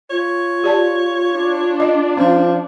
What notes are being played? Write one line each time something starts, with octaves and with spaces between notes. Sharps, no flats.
F4 C#5
G4 D5 A5
D4
D#5
F3 C#4